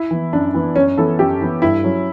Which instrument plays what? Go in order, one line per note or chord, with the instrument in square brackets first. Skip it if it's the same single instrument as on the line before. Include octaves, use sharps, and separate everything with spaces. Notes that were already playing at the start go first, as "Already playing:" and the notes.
Already playing: [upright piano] E4
[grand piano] E3 B3
[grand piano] F#2 [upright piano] D4
[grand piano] E3 B3
[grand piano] F#2 [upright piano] C#4
[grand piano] E3 B3 [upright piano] A4
[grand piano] F#2 [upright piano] G4
[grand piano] E3 B3
[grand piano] G2 [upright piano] E4
[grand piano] F#3 C#4